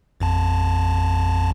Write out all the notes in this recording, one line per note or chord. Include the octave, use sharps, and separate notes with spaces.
A1 F2 A5